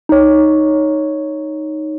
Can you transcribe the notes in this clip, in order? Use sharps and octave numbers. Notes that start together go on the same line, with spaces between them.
D#4 C#5